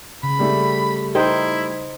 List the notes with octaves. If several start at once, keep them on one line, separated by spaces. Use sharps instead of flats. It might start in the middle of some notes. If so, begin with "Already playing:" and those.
C#3 B5
G3 A3
D#4 E4 C5 G5